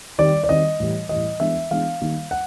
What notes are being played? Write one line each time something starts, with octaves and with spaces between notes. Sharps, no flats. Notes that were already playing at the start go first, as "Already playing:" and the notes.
D#3 G3 C4 D5
D5
D#3 G3 C4 D#5
A2 E3 G3
A2 E3 G3 D#5
E3 G#3 B3 D4 E5
E3 G#3 B3 D4 F5
D#3 G3 A#3 D#4
F#5